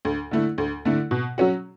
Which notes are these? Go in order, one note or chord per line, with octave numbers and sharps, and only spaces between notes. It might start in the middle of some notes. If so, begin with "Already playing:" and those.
D2
D3 A3 E4
D2
D3 A3 E4
B2
F#3 C#4 F#4